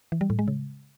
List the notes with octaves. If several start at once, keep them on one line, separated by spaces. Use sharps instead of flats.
E3
G3
A2
G#3
C#3